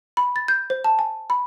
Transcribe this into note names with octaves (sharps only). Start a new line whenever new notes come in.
B5
A6
G6
C5
A5
G#5
B5